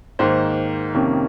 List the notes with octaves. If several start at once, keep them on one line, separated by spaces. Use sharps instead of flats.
G#2 D#3 A#3 C5
F2 C3 D#3 A#3 C#4